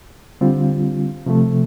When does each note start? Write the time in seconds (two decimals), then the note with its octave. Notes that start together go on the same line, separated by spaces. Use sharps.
0.41 D3 G3 C4 F4
1.26 C3 F3 A3